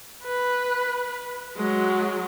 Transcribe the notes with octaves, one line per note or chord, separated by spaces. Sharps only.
B4
F#3 G#3